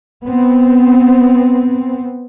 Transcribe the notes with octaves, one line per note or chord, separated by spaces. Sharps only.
B3 C4